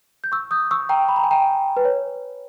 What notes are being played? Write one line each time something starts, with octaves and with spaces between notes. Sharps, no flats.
G6
C#6 E6
D#6 G6
C#6 E6
G5 A#5
B5
A#5
G#5
G5 A#5
B4
C#5